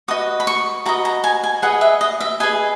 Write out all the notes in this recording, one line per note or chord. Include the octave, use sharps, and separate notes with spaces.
F#4 B4 D#5 D#6
B5
C#6
F#4 B4 D#5 A#5
A#5
G#5
G#5
G#4 B4 D#5 F#5
E5
D#5
E5
G#4 B4 D#5 G#5